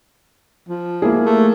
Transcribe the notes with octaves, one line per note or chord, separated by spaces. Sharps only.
F3
A#3 E4 G#4
A3